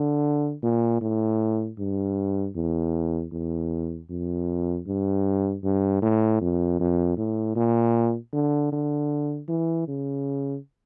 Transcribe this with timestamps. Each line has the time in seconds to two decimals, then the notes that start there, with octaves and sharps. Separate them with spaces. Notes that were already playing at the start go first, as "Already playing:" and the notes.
Already playing: D3
0.63 A#2
1.01 A2
1.79 G2
2.56 E2
3.32 E2
4.10 F2
4.87 G2
5.64 G2
6.02 A2
6.41 F2
6.80 F2
7.17 A2
7.56 A#2
8.33 D3
8.72 D3
9.49 E3
9.88 C#3